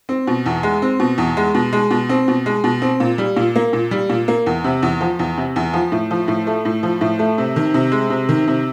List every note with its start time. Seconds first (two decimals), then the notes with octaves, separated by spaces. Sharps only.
0.09 C4
0.27 B2
0.46 E2
0.63 G#3
0.82 C4
1.00 B2
1.18 E2
1.37 G#3
1.55 B2
1.73 G#3
1.91 B2
2.09 C4
2.28 B2
2.46 G#3
2.64 B2
2.82 C4
3.00 A#2
3.18 G3
3.36 A#2
3.56 A#3
3.73 A#2
3.91 G3
4.10 A#2
4.28 A#3
4.46 E2
4.64 C3
4.83 E2
5.01 F3
5.19 E2
5.37 C3
5.56 E2
5.73 F3
5.92 A2
6.11 F3
6.28 A2
6.47 A3
6.65 A2
6.83 F3
7.01 A2
7.19 A3
7.38 C3
7.56 D#3
7.74 C3
7.92 G#3
8.10 C3
8.29 D#3
8.48 C3